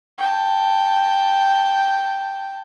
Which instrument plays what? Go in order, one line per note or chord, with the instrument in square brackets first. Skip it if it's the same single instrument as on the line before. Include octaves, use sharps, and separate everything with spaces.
[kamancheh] G5 A5